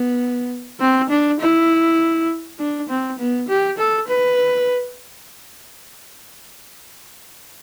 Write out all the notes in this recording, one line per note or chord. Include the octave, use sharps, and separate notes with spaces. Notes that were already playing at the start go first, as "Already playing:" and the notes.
Already playing: B3
C4
D4
E4
D4
C4
B3
G4
A4
B4